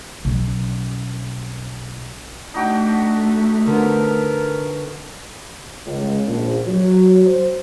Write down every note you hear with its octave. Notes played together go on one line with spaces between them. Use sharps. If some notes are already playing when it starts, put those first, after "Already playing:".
B1 C#4
A3 D4 D#4 F#4 G5
D3 F3 B3 A#4
C#2
A#1
F#3
C5